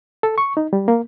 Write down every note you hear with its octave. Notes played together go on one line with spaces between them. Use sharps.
A4
C#6
D#4
G3
A#3